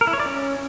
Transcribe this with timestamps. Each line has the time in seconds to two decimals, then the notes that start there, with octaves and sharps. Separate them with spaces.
0.01 A#4
0.07 E4
0.13 C#5
0.20 D5
0.26 C#4